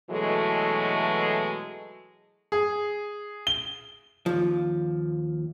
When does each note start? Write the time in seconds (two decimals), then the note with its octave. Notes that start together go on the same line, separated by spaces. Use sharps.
0.11 B2 E3 F#3 G#3 A3 A4
2.52 G#4
3.47 G7
4.26 D#2 F3